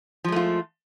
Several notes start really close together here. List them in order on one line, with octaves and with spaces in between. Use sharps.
F3 G#3 A3 F4